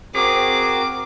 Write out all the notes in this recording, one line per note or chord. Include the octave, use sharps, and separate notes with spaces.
C4 F#4 G#4 A#4 D6